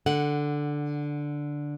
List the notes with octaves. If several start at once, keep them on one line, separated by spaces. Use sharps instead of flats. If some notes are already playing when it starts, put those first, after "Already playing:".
D3 F#5